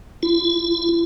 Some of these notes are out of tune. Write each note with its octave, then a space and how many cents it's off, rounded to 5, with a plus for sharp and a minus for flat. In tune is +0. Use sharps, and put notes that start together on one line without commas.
E4 +45